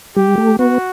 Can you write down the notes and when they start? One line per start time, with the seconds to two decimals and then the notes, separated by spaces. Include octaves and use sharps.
0.16 G3 G4
0.38 A3
0.59 B3 F#4